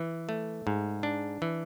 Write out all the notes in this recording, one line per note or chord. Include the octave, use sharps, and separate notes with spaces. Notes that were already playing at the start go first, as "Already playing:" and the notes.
Already playing: E3
A3
G#2
D4
E3